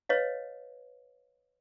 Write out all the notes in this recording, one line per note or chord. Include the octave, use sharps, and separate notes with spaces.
B4 C#5 D#5 F5